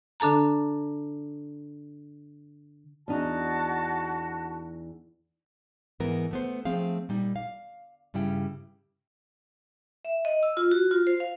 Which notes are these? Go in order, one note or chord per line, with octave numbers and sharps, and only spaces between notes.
D3 D4 A4 A5 A#5
E2 D4 D#4 F#4 A5
G#2 E3 B3 A#4
A3 B3 C5
F3 A3 C4 G#4 F5
A#2 G3 D#4
F5
G2 C#3 G3 E4 G5
E5
D#5
E6
F4
F#4
F4
C5
F5